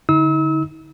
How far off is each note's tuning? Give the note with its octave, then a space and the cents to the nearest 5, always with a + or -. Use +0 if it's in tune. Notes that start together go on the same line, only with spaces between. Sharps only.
D3 +0 D#4 +40 E6 -35